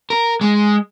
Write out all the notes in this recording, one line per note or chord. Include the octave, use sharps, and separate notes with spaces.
A#4
G#3